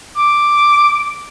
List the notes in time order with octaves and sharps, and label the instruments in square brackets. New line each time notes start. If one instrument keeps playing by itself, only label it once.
[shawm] D6